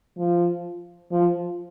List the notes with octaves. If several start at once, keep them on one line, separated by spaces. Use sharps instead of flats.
F3
F3